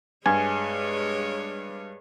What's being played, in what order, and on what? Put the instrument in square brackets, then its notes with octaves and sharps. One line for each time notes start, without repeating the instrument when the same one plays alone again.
[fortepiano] G2 [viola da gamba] G#3 C#5 [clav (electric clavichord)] G#5